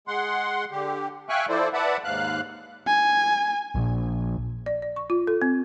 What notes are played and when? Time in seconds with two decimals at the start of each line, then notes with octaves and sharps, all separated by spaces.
0.08 G#3 F#5 C6
0.71 D3 G4
1.29 E5 F5 G5 G#5 C#6 F#6
1.49 F3 E4 A4 C5 D5
1.73 B4 D5 E5 F#5 A5 B5
2.04 D#2 G#2 F5 F#6
2.87 G#5
3.75 A#1
4.66 D5
4.82 D5
4.96 C#6
5.10 F4
5.27 A4
5.42 C4